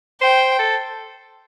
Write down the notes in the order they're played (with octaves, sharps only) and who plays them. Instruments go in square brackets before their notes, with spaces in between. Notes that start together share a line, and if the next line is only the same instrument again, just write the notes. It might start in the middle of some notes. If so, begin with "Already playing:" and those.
[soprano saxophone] C5 [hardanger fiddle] G5
[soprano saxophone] A4